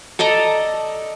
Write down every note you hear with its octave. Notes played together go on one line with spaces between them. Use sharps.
A4 D5 D#5 A#5